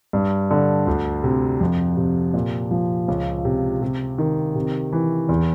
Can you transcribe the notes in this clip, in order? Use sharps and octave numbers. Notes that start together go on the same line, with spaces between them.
G2
D3
D2
C3
F2
C3
A#2
F3
C#2
C3
C3
D#3
C3
E3
E2